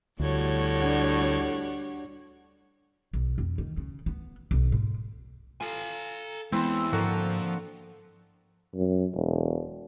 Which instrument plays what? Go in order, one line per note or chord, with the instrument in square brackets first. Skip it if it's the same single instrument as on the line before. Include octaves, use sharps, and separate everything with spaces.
[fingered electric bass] D2 [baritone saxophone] A2 [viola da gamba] G3 F#4 C#5
[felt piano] D4 F#5
[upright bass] B1
F2
D#3
C#3
B3
B1
G#2
[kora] F4 [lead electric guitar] A4 G#5
[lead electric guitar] E2 [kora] E3 [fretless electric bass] G#3 B3 [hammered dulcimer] C4
[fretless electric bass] G#2 [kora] D3 A#3 A4 [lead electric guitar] F3 [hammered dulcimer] F#4
[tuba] F#2
E1